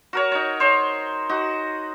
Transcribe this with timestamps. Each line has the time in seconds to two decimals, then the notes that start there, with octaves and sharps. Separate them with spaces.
0.13 F#4 A#4 C#5
0.32 D#4 C#5
0.60 C5 C#5
1.29 D#4 F#4